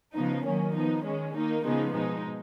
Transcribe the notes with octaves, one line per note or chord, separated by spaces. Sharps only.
C#3 F3 B3 D#4
D#3 F#3 A#3 C#4
F3 B3 D#4
D#3 G#3 C#4
D#3 A#3 D#4
C#3 F3 G#3 B3 D#4
B2 G#3 D#4